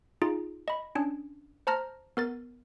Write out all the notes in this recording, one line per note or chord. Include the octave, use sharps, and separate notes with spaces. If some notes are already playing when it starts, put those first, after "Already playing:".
D#4 F4 G#4
D#5 B5
C#4 D4
C5 A5 A#5 F6 A#6
B3 A#4 A6